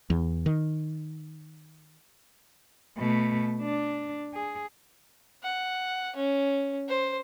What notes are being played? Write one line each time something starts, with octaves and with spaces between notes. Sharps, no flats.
E2
D#3
B2 A3
D4
G#4
F#5
C#4
C5